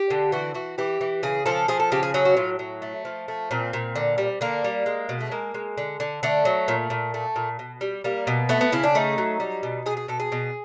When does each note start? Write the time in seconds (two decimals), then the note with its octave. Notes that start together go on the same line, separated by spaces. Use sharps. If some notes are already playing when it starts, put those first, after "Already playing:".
Already playing: G4
0.10 D3
0.32 E3 F#4
0.54 E3 F#4
0.78 E3 G4
1.01 E3
1.23 C#3 G#4
1.46 F3 A4
1.68 F3 G#4
1.80 A4
1.92 C#3 G4
2.03 G#4
2.14 F#3 G#4
2.25 F#4
2.37 A2 F4
2.59 F#3
2.82 A3
3.05 F3
3.28 A3
3.51 A#2 C4
3.73 A#2
3.96 D3
4.18 G3
4.41 D3 A#3
4.64 G3
4.86 G#3
5.09 B2
5.21 A3
5.32 G#3 A#3
5.54 G#3
5.78 D3
6.00 D3
6.23 D3 A3
6.45 F#3
6.68 A#2
6.90 A#2
7.14 A3
7.36 A#2
7.59 B2
7.81 G3
8.04 G3 A#3
8.27 B2
8.49 A3 B3
8.61 B3
8.72 C#3 E4
8.84 D4
8.95 A3 D#4
9.18 F#3
9.40 G3
9.63 B2
9.86 B2 G#4
9.97 G#4
10.08 B2 A4
10.20 G#4
10.32 B2